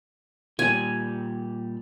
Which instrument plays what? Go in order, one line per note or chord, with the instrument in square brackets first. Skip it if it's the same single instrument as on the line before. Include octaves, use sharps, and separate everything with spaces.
[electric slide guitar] A#2 G3 [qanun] G#5